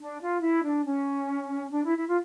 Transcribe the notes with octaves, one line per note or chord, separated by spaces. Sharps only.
D4
F4
E4
D4
C#4
D4
E4
E4
F4